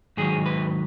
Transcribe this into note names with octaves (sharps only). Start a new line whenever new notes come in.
G#2 D#3 F#3 G#4
B4